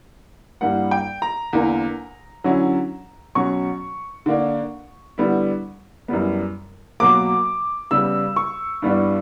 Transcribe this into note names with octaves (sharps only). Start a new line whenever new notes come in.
G2 E3 G3 A#3 F#5
G5
A#5
E2 D3 A#3
D3 F#3 C#4 E4
B2 F#3 C#4 C#6
D3 A#3 D4
D3 G3 B3 E4
F#2 E3 G3 B3
B2 F#3 A#3 D6
C#3 G3 B3 E6
C#6
G2 E3 G3 B3 D4